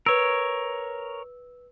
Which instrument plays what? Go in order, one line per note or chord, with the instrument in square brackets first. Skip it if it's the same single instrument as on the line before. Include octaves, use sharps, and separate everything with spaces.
[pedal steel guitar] A#4 C#5 [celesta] B4 E6